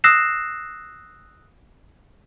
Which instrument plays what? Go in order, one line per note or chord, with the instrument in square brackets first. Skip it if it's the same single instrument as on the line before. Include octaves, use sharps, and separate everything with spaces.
[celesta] D#6 E6 F#6 A#6 C7 E7